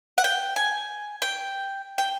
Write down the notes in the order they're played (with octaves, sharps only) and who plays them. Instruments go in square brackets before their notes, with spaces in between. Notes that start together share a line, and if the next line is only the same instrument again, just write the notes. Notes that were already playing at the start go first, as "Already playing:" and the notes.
[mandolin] F#5
G5
G#5
G5
G5